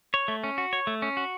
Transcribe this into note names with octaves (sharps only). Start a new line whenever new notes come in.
C#5
A3
C#4
F#4
C#5
A3
C#4
F#4